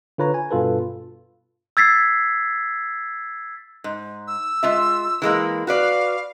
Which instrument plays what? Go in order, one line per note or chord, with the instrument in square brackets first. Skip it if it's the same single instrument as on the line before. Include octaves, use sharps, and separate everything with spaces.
[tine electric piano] D3 F4 B4 C#5 A#5
G#5
G2 B2 F4 A4 B4
[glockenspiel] E6 G#6 A6 B6 C7
[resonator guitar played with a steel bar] G#2
[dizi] E6
[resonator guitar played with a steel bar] G#3 F4 E5
E3 G#3 A#3
[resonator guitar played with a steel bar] F#4 B4 D5 [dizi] F5